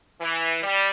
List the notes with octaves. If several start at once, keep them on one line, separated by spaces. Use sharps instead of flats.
E3
G3